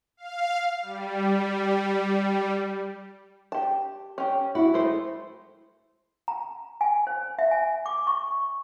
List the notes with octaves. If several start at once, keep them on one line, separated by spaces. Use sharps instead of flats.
F5
G3
G4 A5
C#4 G4
E4 F#4
G#3 A3 C5
A#5
G#5
C5
E5
G#5
D6
C#6